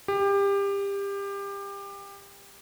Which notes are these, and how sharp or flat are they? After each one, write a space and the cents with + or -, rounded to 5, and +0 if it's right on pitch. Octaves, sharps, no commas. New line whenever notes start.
G4 +25